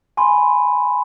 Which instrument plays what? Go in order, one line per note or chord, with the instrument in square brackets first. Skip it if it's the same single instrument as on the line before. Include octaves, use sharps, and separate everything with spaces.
[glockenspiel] G#5 B5 C6